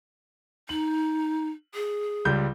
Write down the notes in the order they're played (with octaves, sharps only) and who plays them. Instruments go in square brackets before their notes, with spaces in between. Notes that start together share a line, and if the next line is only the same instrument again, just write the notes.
[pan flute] D#4 [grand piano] F#7
[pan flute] G#4
[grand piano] C#2 G3 G6